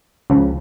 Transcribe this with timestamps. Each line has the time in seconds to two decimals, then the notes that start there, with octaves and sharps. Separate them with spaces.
0.30 C#2 C#3 F3